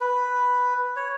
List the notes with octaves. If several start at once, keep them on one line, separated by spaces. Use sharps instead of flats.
B4
C#5